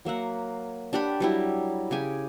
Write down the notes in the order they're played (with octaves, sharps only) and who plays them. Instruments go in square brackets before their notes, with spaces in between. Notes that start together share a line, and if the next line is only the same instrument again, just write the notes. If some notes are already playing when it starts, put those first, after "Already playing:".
[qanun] F#3 A#3 E5 F#5
D4 G4 F#5 B5
F#3 G3 E4
C#3 G4 G#5